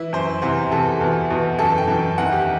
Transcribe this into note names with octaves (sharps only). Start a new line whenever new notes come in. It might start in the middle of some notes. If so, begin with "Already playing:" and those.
Already playing: E3 E4
F#2 E3 C5
E2 C3 E3 C5
E2 C3 E3 A4
E2 B2
E2 B2
F#2 E3 A4
G5
F#2 E3
E2 D#3 F#5
G4